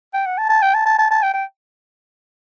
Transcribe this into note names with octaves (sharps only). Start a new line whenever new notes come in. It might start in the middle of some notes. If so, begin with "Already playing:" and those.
G5
F#5
A5
A5
G5
A5
A5
A5
A5
G5
G5